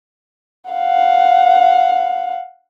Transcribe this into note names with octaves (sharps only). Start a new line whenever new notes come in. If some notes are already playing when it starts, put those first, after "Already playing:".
F5 F#5